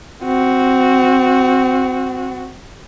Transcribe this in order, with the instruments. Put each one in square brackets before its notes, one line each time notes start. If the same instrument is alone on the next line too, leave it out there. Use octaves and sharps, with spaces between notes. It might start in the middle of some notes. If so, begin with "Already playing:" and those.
[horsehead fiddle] C4 F#4